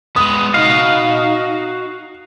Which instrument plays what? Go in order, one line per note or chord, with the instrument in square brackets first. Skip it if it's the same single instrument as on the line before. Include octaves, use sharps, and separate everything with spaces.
[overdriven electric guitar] G#3 B3 [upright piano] D#6
[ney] D#4 [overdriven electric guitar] F#4 D#5 [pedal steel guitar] F5